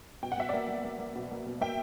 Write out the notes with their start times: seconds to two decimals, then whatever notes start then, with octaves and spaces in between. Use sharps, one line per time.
0.23 B2 G5
0.32 F#5
0.38 B2 E5
0.49 A#3 D5 F#5
0.69 A#3
0.84 A#3
0.99 A#3
1.16 B2
1.31 A#3
1.46 B2
1.61 A#3 E5 G5